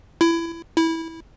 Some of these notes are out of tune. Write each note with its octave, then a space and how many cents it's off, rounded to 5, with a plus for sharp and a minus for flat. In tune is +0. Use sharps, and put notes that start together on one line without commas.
E4 +20
E4 -15